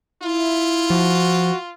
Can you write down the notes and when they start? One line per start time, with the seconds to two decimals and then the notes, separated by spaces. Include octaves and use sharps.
0.23 E4 F4
0.90 F3 F#4